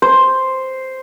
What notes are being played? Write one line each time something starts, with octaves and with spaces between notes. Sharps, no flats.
C5